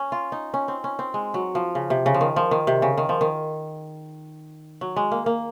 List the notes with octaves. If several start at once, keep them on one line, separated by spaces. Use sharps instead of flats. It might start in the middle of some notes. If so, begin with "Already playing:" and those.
Already playing: C#4
F4
D#4
C#4
C4
C#4
C4
G#3
F#3
F3
C#3
C3
C#3
F3
D#3
F3
D#3
C3
C#3
D#3
F3
D#3
F#3
G#3
A#3
A#3